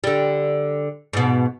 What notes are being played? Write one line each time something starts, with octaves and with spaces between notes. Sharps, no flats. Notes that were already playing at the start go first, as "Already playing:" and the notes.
D3 G3
G#2 B2